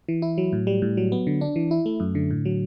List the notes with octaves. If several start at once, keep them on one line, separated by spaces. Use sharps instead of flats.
E3
E4
F#3
A2
G3
A2
F#3
B3
D3
D4
E3
E4
A3
F#2
D3
A2
F#3